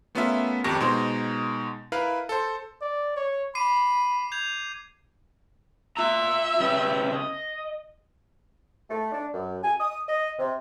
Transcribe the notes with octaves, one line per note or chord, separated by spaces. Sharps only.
A3 B3 C#4 F4 A#4 E5
G#1 F2 G4 A#4 C#6 A#6
B2 G#3 D#4 C5 C6
E4 A#4 B4 F5
A4 C5
D5
C#5
B5 D6 C7 D#7
G6 G#6 F7
F4 E5 A#5
C#3 G4 B4
D#5
A3
D4
F#2
G#5
D#6
D#5
C3